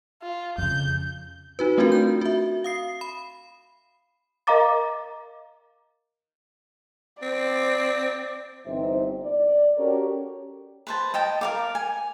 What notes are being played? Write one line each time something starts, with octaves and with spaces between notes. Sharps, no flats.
F4
F2 C#3 G6
D#4 F#4 B4
A3 C4 D4 F4 F#4 A#4
G6
F#4 E5
F5 D#6 C7
B5
A#4 D#5 F5 A#5 D6 A6
C4 D5
G1 E3 C4 D#4 C5 E5
D5
C#4 F#4 G4 A4 A#4 C#5
B4 C5 A5
D#5 G5 A5
A#4 F5 D6
G#5